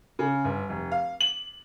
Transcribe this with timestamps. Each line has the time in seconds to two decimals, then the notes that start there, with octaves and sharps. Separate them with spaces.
0.19 C#3
0.44 G1
0.69 F1
0.92 F5
1.21 F#7